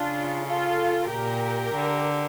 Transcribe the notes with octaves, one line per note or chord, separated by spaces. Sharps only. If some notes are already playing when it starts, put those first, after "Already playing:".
Already playing: C#3 D4 F4
F4 A4
A#2 G4 A#4
D3